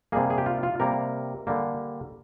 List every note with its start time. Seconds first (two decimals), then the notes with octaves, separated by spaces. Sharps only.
0.12 C3 G3 A#3 G#4
0.30 G#4
0.38 G4
0.46 F4
0.63 F4
0.80 C3 G3 A#3 A#4
1.47 D3 G3 A#3